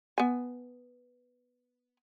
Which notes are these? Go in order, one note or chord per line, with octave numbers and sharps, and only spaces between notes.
B3 G#5